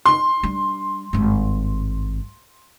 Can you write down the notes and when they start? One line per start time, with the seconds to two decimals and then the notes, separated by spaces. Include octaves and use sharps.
0.06 C6
0.43 G3 D4
1.13 G#1 G2